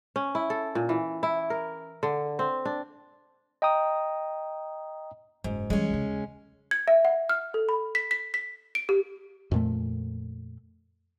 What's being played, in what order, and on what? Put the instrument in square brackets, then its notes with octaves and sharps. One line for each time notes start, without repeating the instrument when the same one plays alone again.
[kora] C#4
E4
A4
A#2
E3
E4
A#4
D3
C4
D4
[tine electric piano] D#5 G5 A#5 D#6
[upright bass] F#1 [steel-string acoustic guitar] G#2
[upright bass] E3 G3 [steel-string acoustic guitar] G#3 C#4
[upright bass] D#2 C#3
[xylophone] G#6
E5
F#5
F6
A4
B5
B6
B6
B6
D7
G4
[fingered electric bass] F2 A#2 A3